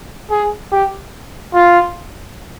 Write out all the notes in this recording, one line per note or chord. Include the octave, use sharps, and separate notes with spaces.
G#4
G4
F4